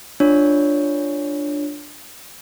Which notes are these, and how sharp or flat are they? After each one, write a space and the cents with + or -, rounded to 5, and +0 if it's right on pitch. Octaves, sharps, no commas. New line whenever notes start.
D4 +5 F4 +0 C#5 +0